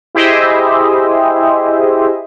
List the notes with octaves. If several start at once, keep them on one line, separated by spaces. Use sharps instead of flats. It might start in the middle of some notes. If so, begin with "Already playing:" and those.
E4 G4 G#4 C5 D#5 E5